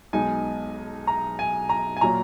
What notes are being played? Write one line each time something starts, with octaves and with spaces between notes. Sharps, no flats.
B1 B2 G#3 D#4 G#5
A#5
G#5
A#5
G#5
A#2 F#3 A#5